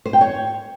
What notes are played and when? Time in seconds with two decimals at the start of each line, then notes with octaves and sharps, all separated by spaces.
0.06 C5
0.13 G5
0.21 C#5